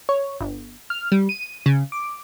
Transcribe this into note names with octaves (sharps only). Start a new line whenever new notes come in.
C#5
G1
F6
G3
D#7
C#3
D6